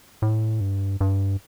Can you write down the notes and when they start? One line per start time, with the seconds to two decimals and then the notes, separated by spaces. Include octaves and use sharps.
0.22 A2
0.61 G2
1.01 G2